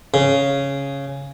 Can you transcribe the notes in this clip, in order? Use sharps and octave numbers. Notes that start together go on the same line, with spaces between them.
C#3